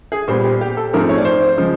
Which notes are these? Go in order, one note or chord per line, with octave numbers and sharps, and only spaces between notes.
G#4
A#2 G3 B3 C5
G4
G4
A4
G#2 F3 A3 C4 A#4
C#5
D5
C5
C#3 F3 G#3